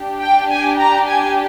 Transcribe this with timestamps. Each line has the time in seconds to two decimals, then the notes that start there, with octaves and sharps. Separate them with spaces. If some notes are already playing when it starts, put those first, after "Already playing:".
Already playing: D4 G4
0.20 G5
0.49 G#5
0.78 A#5
1.06 G#5